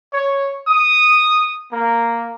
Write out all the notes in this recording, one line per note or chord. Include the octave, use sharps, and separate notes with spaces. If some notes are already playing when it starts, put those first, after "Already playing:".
C#5
D#6
A#3